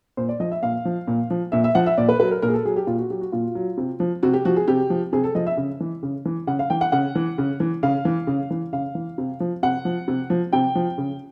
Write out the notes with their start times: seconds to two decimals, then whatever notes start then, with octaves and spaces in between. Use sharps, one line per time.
0.17 A#2 C5
0.29 D5
0.40 F3 D#5
0.51 E5
0.63 A#2 F5
0.85 F3
1.08 A#2
1.30 F3
1.52 A#2 E5
1.64 E5
1.75 F3 F#5
1.86 E5
1.98 A#2 D5
2.09 B4
2.20 F#3 B4
2.31 A#4
2.42 A#2 A#4
2.48 G#4
2.54 A4
2.65 F#3 G#4
2.76 G4
2.87 A#2 F4
2.99 F#4
3.10 F#3 G4
3.21 F#4
3.32 A#2 F4
3.55 F#3
3.78 C3
4.00 F3
4.23 C3 F#4
4.34 G4
4.45 F3 F#4
4.57 G#4
4.68 C3 G4
4.90 F3
5.13 C3 G#4
5.24 A4
5.35 F3 D#5
5.47 E5
5.57 C#3
5.80 E3
6.03 C#3
6.25 E3
6.47 C#3 F#5
6.59 F5
6.70 E3 G5
6.81 F#5
6.92 C#3 F#5
7.15 E3
7.38 C#3
7.60 E3
7.83 C#3 F5
8.05 E3
8.27 C#3
8.50 E3
8.73 C#3 F5
8.95 E3
9.18 C3
9.40 F3
9.63 C3 F#5
9.85 F3
10.08 C3
10.30 F3
10.52 C3 G5
10.75 F3
10.98 C#3